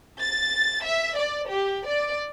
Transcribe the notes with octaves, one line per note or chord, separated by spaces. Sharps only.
A6
E5
D5
G4
D5